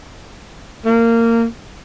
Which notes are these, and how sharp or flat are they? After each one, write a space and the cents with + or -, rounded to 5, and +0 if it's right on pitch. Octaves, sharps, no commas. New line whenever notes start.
A#3 -20